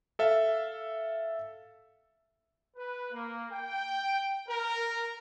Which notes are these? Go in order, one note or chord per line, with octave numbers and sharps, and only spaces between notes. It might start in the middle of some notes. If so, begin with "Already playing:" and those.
A4 E5 F5
B4
A#3
G5
A#4